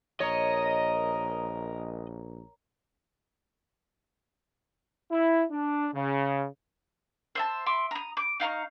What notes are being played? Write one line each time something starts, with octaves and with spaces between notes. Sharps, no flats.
A#1 A#4 C#5 D#5
E4
D4
C#3
C5 E5 A5
E5 C6 D6
A#5 D#6
D6
D#4 F5 A#5 C#6